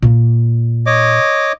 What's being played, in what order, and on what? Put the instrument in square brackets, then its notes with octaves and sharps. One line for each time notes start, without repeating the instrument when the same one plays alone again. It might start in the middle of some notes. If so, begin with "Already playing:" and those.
[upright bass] A#2 A#3
[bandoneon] C#5 D#5 D6